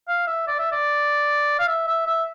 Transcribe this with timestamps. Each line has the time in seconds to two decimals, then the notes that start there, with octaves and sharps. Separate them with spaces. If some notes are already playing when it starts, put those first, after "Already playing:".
0.08 F5
0.27 E5
0.47 D5
0.58 E5
0.71 D5
1.59 F5
1.67 E5
1.87 E5
2.06 E5